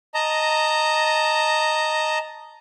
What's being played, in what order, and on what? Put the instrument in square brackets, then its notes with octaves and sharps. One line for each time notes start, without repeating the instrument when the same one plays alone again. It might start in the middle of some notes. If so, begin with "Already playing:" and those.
[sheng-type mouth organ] D#5 A5 A#5